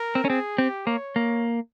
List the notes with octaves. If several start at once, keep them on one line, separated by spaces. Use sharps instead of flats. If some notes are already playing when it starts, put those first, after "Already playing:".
Already playing: A#4
C4
C#4
C4 G#4
C4 G4
A#3 C#5
A#3